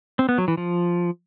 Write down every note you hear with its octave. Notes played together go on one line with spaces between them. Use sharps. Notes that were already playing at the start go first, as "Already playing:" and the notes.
C4
B3
F#3
E3
F3